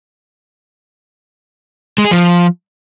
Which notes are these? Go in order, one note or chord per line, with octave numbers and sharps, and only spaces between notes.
G#3
G#4
F3